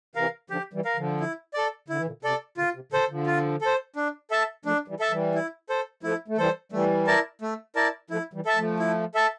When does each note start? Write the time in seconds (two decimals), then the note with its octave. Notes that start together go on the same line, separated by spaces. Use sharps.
0.15 C3 E3 A#4 F5
0.50 D3 F3 G4
0.73 E3 G3
0.85 A#4 F5
0.96 D3 F3
1.20 E4
1.54 A4 D5
1.88 D3 E4
1.97 E3
2.06 A#2 D3
2.23 C3 A4 D5
2.57 A#2 D3 F4
2.75 C3
2.92 A#2 D3 A4 C5
3.09 D3 F3
3.26 F4
3.61 A4 C5
3.96 D4
4.31 A4 E5 A5
4.65 F3 A3 D4
4.88 E3 G3
5.00 A4 E5 A5
5.11 E3 G3
5.35 E4
5.69 A4 C5
6.03 F3 A3 E4
6.28 A3
6.37 E3 G3 A4 C5
6.72 E3 G3 A3
7.07 E4 A#4 D5 A5
7.42 A3
7.76 E4 A#4 D5 A5
8.10 F3 A3 E4
8.33 E3 G3
8.45 A4 E5 A5
8.56 F3 A3
8.79 E4
9.14 A4 E5 A5